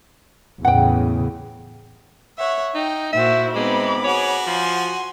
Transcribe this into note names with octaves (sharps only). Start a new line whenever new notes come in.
E2 A2 C#3 F#5 G5
C#5 E5 F#5
D#4 G5
A#2 E4 F#4 C5 E5
G#3 B3 C4 D#4 B5 D6
F#4 G#4 C#5
F3 G#5 C6